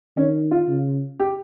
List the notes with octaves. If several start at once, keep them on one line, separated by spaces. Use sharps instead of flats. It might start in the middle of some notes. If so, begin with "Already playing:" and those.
D#3 C#4
F4
C#3
G4